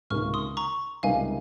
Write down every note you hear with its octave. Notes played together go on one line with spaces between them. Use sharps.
C#2 C3 D#3 A#3 C#6 F6
C6 D#6
A#5 C#6
C#2 C3 G3 A#3 D#4 F5 G#5